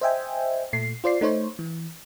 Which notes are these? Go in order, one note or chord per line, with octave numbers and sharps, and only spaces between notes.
C5 D#5 E5 G5 G#5
A#2 A3 C7
F4 C5 D5 C7
A3 D#4 C5 C#5
E3